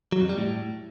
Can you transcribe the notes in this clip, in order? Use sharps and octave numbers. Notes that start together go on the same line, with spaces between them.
F#3
F2
G3
A2